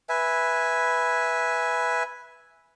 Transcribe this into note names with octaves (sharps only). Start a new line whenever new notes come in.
B4 E5 G#5